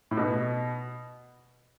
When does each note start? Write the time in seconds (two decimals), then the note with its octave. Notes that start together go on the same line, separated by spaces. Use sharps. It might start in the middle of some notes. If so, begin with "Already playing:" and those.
0.11 A2
0.17 B2